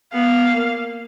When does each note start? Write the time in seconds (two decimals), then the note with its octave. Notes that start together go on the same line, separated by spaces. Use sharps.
0.13 B3 F5
0.53 A#3